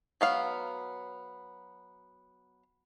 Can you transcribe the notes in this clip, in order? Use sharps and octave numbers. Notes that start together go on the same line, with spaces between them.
F#3 B3 F5